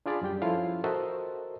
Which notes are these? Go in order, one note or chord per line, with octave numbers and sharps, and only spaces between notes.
D4 F4 G#4 D5 F5 B5
F#2 G3 G4 G5
F3 C#4 E4 F4 A4 F5
F#4 A4 A#4 C5 D#5 E5